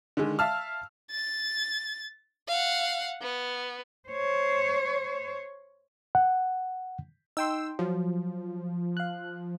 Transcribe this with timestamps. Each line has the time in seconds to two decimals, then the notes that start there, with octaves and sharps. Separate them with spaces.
0.17 D3 D#3 G#3
0.39 E5 F5 A5 E6 F6
1.11 A6
2.48 F5 F#5
3.22 B3
4.09 C5 C#5
6.15 F#5
7.37 D#4 G5 C6 E6
7.79 F3 F#3
8.97 F5 F#6